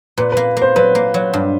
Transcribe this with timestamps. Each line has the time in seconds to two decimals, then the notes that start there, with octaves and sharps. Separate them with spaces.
0.17 A#2 B4
0.32 A#3 B4
0.57 A#3
0.62 C5
0.76 F#3 B4
0.95 A#3
1.14 F#3
1.33 G2